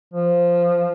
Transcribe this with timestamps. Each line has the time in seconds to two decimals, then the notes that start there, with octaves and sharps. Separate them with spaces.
0.14 F3